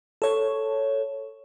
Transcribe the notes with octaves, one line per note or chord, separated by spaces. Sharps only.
A4 C#5